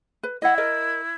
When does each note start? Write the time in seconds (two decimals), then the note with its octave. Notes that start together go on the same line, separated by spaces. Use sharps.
0.23 B4
0.42 E4 D#5 F#5
0.58 A#4 D#5